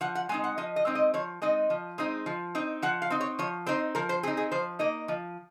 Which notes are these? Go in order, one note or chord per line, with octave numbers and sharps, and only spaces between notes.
F3 F#5
F#5
G#3 C4 D#4 G#5
F#5
F3 D#5
D#5
G#3 C4 D#4
D#5
F3 C#5
G#3 C4 D#4 D#5
F3
G#3 C4 D#4
F3
C4 D#4
F3 F#5
F5
C4 D#4
C#5
F3 C#5
C4 D#4 C5
F3 A#4
C5
C4 D#4 G#4
G#4
F3 C5
A#3 D#4 D#5
F3